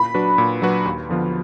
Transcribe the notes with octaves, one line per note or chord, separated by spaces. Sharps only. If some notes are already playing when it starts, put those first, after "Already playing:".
Already playing: A#2 B5
F#3 D4 F#4 B4
A#2
F#3 D4 F#4 B4
D#2
D3 F3 B3 F4